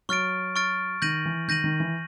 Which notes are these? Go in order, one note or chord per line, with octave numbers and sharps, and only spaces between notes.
F#3 C#6 F6 A6 D7
C#6 F6 A6 D7
D#3 G6 A#6 D#7 F#7
E3
D#3 G6 A#6 D#7 F#7
D#3
E3